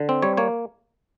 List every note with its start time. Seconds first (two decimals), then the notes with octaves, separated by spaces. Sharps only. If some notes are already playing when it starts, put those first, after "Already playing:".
Already playing: D3
0.09 C4
0.22 G3 C#5
0.37 A#3 C#5